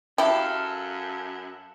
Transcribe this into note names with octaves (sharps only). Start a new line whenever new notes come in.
F#2 E4 G4 A4 F5